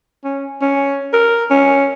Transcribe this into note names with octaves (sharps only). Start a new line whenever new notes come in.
C#4
C#4
A#4
C#4